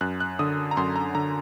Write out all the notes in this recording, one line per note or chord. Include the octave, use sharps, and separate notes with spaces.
F#2 F#6
F#6
D3 D#6
A#5
F#2 C6
A#5
D3 A#5